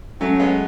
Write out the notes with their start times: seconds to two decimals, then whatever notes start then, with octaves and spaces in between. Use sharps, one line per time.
0.20 F#3 A3 C#4
0.39 G#3 B3